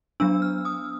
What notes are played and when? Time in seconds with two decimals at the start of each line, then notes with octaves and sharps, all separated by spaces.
0.20 F#3 B3 D4 E6
0.42 F6
0.65 D#6